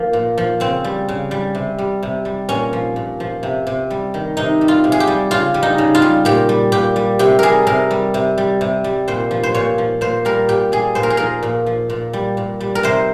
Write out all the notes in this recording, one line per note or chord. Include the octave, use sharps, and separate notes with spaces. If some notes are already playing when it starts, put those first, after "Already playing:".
Already playing: F3 A#3
A#2
F3
C#3 C4
G3
C#3
G3
C3
G3
C3
G3
A#2 C#4
F3
A#2
F3
C3
C3
G3
D#3
C3 D#4
G3
F4
C3
G#4
G4
G3
C#3 F4
G3
D#4
C#3
F4
G3
A#2 G4
G3
A#2 G4
G3
C3 G4
G3 G#4 A#4
C3 A#4
G3
C3
G3
C3
G3
A#2 C5
F3
C5
A#2 C#5
F3
A#2 C5
G3 A#4
A#2 G4
G3 G#4
A#2 C5
A#4
G#4
F3 A#4
A#2
F3
A#2
G3
A#2
G3
A#4
C3 C5